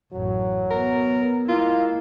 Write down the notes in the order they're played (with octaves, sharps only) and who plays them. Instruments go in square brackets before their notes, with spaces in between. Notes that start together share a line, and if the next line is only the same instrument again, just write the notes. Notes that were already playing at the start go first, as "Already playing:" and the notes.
[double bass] A1 F#2 [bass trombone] F#3
[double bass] B3 [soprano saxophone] A#4
[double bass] G#3 E4 [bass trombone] A#3 [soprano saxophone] F4